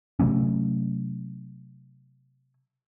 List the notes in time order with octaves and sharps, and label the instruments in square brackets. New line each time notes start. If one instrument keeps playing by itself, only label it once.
[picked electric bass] C3 F#3 A3 C#4